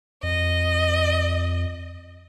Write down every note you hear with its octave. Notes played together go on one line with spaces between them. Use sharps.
F2 D#5